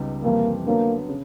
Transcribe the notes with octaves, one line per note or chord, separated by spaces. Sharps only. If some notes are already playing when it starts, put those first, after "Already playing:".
Already playing: C#2 G3 B3 D#4
F2 C3 E3 G3 A#3
D3 F#3 A#3 B3
C#3